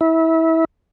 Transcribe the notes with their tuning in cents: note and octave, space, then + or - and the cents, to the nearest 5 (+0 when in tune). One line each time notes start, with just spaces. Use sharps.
E4 -25